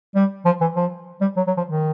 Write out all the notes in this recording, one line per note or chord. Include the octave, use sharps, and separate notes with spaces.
G3
F3
E3
F3
G3
F#3
F#3
F3
D#3